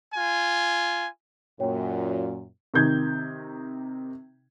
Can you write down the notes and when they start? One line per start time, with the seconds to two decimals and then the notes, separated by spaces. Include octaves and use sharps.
0.14 F4 G#5
1.60 F#2 A#2 C#5 G5
2.74 C3 D#3 D#4 G6 G#6